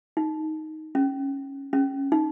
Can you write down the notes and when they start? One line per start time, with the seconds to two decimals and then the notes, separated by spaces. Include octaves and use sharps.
0.17 D#4
0.95 C#4
1.73 C#4
2.12 D#4